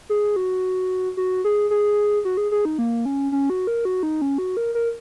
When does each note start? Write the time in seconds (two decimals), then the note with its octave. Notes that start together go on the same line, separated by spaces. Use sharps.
0.09 G#4
0.36 F#4
1.17 F#4
1.44 G#4
1.70 G#4
2.25 F#4
2.37 G#4
2.51 G#4
2.65 D#4
2.78 A#3
3.05 C#4
3.32 C#4
3.50 F#4
3.67 A#4
3.85 F#4
4.03 D#4
4.22 C#4
4.38 F#4
4.57 A#4
4.75 A#4